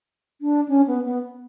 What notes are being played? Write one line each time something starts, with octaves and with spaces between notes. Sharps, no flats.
D4
C#4
B3
B3